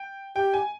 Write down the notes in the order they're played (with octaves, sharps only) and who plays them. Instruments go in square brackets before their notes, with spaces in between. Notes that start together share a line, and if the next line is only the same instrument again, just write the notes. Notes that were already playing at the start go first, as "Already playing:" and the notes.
Already playing: [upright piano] G5
[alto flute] G4 [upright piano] G5
[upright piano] G#5